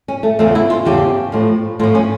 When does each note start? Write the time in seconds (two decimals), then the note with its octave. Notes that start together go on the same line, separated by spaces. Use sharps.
0.08 C#4
0.23 A3
0.39 E2 C#3 F3 A3
0.55 E4
0.70 F4
0.85 E2 C#3 F3 G4
1.32 A2 F3
1.79 A2 F4
1.83 F3
1.95 C#4